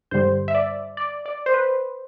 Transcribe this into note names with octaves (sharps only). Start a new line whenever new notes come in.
G2 D3 G3 C5
E5
D5
D5
D5
C5
B4